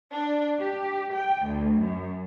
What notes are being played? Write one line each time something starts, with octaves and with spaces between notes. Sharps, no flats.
D4
G4
G5
D2
F#2